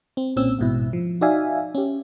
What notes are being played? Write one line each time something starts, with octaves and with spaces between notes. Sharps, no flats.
C4
B1 A#2 C4 C#4 E6
A1 G#2 B2 E4
F3
D#4 F#4 D5 E5 F5 G#5
C#4 G4